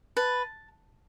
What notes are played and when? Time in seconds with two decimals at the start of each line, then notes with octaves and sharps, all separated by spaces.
0.17 B4 A5